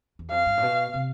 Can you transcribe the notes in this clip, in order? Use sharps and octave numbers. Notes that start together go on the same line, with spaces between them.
E2
F2 F5
G2
A2
B2
C3